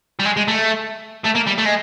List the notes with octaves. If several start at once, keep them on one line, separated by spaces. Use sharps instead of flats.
G3
G#3
G#3
A3
A3
A#3
G3
A3
G#3